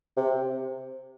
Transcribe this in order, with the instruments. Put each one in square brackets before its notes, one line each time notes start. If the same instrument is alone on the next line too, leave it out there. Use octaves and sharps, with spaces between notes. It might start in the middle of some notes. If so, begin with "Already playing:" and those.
[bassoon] C3